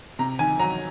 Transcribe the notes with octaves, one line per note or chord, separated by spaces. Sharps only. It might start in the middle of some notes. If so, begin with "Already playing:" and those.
C3 A#5
D#3 G#5
F#3 A#5